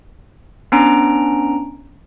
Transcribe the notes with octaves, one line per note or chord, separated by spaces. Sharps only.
B3 C#4 D4 A#5 D7